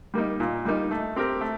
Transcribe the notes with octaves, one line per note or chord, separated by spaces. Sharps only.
G3 A#3 D#4
A#2
G3 A#3 D#4
A3
C4 G4 A#4
A3